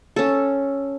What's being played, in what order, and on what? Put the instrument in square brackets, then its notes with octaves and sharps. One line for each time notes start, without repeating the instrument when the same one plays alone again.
[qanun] C#4 A4